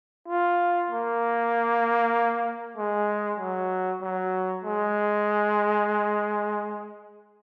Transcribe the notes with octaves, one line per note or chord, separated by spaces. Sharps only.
F4
A#3
G#3
F#3
F#3
G#3